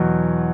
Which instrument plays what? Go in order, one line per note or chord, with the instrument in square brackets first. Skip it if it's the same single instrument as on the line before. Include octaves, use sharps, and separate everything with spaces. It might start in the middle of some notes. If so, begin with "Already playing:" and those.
Already playing: [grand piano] E2 B2 F#3